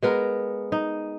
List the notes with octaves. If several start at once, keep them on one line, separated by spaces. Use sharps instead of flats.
G#3 B3 A#4
D#4